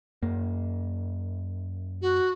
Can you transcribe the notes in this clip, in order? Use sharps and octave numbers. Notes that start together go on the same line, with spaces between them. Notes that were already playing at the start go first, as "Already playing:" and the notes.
F#2 A#3
F#4